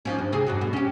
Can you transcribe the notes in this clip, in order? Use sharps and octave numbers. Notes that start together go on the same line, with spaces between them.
D#2 F3 C#4
G2
C3 G#4
E2 G2 F#3
B2
C#4 G4